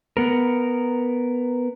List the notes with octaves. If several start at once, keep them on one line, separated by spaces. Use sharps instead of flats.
B3 A#4